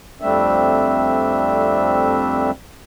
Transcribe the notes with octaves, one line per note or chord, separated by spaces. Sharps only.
F2 G3 A3 C4 D4 E5